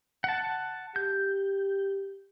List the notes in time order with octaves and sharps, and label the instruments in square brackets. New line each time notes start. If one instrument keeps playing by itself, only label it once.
[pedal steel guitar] F#5 A5
[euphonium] G4 [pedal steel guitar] G6